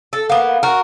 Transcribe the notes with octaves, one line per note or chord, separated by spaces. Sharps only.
A4
A#3 B3
F#4 A#4